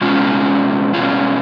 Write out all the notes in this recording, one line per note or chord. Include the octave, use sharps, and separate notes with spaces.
B2 G#3 C#4 F4
B2 G#3 C#4 F4